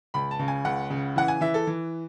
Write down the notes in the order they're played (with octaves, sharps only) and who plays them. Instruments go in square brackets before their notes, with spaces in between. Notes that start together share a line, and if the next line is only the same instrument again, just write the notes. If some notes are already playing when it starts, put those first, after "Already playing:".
[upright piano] C#2 B5
A5
C#3
G#5
C#2 F#5
C#3
E3 F#5
G#5
E3 E5
A4
E3